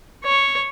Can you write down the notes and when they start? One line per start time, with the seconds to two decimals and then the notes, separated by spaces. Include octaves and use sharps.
0.24 C#5